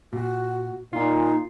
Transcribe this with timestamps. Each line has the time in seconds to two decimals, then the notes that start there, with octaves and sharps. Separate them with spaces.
0.13 A#2 F#4
0.93 A#2 D#4 F4